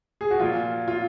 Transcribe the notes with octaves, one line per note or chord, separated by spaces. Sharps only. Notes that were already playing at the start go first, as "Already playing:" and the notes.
G#4
F#4
A#2 F3 F4
F4